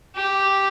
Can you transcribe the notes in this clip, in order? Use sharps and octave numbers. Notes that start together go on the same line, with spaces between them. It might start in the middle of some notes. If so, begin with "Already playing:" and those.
G4